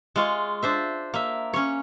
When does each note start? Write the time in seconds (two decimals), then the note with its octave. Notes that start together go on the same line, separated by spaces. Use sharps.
0.16 G#3 F4 C#5
0.63 D4 C5 E5
1.14 A#3 E5
1.53 C#4 C#5